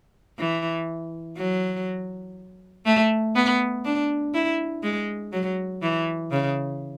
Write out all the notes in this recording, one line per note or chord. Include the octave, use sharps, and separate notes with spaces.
E3
F#3
A3
B3
D4
E4
G#3
F#3
E3
C#3